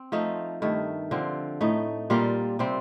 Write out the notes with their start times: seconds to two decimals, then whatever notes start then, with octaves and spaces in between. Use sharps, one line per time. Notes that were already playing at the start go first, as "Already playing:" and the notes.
Already playing: C4
0.12 F3 A3 D#4
0.62 G2 D#3 A3
1.11 D3 F3 C4
1.61 A2 A3 D#4
2.10 A#2 G3 A#3 F4
2.59 C3 G3 C4